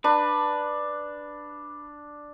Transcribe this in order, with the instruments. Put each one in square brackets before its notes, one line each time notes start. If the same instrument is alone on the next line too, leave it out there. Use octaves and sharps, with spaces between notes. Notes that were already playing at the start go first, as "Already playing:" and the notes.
[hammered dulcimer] D4 [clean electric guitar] B4